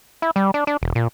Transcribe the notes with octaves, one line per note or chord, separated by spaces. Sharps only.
E4
G3
D4
D4
E1
A#2